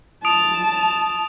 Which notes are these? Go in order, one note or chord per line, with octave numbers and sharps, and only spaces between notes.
A5 D#6 D7 F7